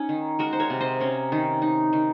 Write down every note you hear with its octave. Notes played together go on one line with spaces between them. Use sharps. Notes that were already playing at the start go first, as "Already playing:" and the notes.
Already playing: C#4 D#4
D#3
G#3 F#4 A#4
C5
A#4 C#5
C3
C5 D#5
C#4 A#4 C#5
D#3
D#4
D#3